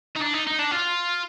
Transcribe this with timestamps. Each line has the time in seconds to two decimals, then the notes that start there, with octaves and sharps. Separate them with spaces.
0.16 D#4
0.22 D4
0.34 D#4
0.47 D#4
0.59 D4
0.71 F4